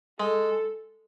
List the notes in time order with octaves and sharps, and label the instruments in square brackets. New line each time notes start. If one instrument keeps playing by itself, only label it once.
[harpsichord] G#3 [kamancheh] A4